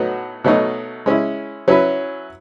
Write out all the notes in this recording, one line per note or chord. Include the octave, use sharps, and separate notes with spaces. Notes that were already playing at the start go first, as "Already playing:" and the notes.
Already playing: A2 F#3 B3 D#4 F#4
B2 F#3 A3 D#4
G#3 C#4 E4
F#3 C#4 E4 B4